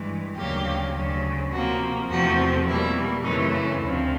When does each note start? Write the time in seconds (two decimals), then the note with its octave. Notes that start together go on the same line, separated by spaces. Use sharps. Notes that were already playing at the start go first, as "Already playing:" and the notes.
Already playing: G2 E3 G#3
0.36 D2 C#3 F#3 A#3 G4
0.95 D2 C#3 F#3
1.51 C3 F3 A#3 F#4
2.09 E2 C3 F3 A3 C4 F#4
2.67 B2 G3 A#3 E4
3.24 F#2 C#3 E3 A3 C4 D#4
3.52 E4
3.81 D2 C3 F3